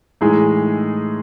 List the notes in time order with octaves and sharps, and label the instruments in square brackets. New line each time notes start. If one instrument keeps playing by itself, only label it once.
[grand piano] A2 E3 G#3 D#4 G#4